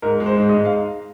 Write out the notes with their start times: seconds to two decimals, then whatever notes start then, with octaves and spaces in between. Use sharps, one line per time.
0.02 G#2 A#4
0.20 G#3
0.26 C5
0.37 G#2
0.49 D#5
0.55 G#2
0.65 F5